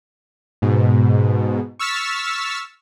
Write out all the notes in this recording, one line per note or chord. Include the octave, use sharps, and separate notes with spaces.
G#2 B2
C#6 E6 F6 A6 B6